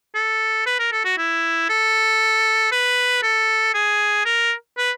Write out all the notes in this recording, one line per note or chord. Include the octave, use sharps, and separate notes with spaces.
A4
B4
A#4
A4
F#4
E4
A4
B4
A4
G#4
A#4
B4